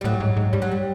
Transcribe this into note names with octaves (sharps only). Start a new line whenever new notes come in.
G3
A2 F#3
G#2
G#2
G2 G3
F#3
G3